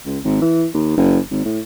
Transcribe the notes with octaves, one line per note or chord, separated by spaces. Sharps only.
C#2
G#1
E3
D#2
F#1
G#1
A2